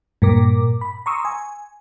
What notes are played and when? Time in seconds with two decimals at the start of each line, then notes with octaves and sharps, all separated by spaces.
0.22 G2 A#2 A#4 D6
0.81 B5
1.06 A#5 C6 C#6 D#6 E6
1.25 G#5